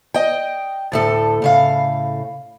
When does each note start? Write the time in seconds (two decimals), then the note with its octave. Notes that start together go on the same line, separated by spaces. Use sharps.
0.14 D#5 G5
0.92 D2 A2 A4
1.42 A2 C#3 F5